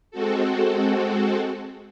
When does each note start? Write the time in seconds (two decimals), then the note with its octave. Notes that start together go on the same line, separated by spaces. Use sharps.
0.11 G#3 C4 F#4 A4